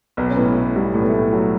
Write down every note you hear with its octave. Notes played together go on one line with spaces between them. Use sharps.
B1 B3
C#4
A2 B3
A2
B1 G3
A2 A3
B3
A2 A3
F#3